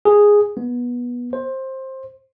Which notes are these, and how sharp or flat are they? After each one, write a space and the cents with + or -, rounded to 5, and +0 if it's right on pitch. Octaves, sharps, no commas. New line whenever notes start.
G#4 -5
B3 -20
C5 +15